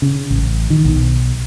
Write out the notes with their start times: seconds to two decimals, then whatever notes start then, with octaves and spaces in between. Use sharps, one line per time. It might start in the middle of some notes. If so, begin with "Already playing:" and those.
0.02 C#3
0.30 A1
0.70 D#3
0.85 B1